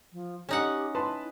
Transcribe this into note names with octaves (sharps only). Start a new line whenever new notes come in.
F3
C#4 D#4 G4 F#5
E4 B4 A5 C6